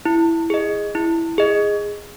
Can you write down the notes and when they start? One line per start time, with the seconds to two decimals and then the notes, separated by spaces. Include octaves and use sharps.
0.05 E4
0.50 G#4 D#5
0.95 E4
1.38 G#4 D#5